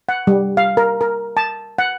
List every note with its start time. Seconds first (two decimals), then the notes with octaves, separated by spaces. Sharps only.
0.09 F#5
0.27 G3
0.57 F5
0.77 A#4
1.01 A#4
1.37 A5
1.78 F#5